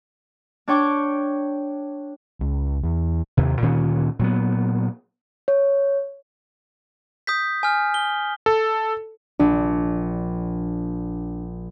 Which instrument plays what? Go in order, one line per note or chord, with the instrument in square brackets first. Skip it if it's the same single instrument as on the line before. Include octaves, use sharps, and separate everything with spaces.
[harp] D4 C#5 G5 C#6 D6
[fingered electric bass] C#2
E2
[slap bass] D#2 C3
D2 A#2 D#3 C#4
A#2 F#3 B3
[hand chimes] C#5
[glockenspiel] D#6 G6 B6
G#5 F6
G7
[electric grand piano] A4
[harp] A#1 [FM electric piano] D4